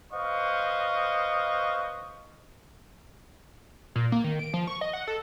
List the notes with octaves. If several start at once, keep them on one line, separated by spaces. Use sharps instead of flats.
B4 C5 D#5 F5 C#6
A#2
A#3
D#3
D7
F3
C#6
D#5
F#5
A4